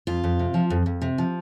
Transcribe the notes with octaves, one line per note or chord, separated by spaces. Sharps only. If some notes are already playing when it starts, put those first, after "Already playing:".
F2 F4
F2
C3
F3
F2
F2
C3
F3